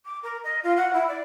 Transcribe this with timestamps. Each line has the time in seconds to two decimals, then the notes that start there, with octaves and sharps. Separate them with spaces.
0.05 D6
0.23 A#4
0.44 D#5
0.63 F4
0.77 F#5
0.93 E4
1.08 D5